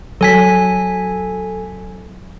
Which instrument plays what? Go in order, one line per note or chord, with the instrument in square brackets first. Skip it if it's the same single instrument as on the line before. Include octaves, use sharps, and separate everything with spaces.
[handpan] F#3 [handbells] A4 G#5 B6